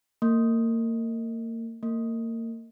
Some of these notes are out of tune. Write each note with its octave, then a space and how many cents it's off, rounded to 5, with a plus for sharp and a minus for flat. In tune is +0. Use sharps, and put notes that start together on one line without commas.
A#3 -35
A#3 -35